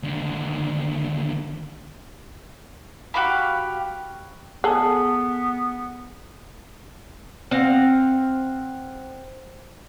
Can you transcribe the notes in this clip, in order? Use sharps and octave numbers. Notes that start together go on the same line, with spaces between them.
D#2 D3
F#4 G4 F5 B5
B3 G#4 A4
C4 F5 F#5